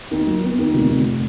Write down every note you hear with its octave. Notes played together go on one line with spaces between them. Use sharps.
D#2
F#3
B3
D#2
F1
F1